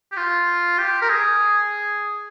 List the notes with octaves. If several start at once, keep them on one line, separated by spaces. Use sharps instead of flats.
G4
F4
G4
A#4
G#4